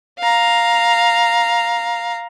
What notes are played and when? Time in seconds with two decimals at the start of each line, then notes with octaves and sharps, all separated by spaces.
0.19 F5 A#5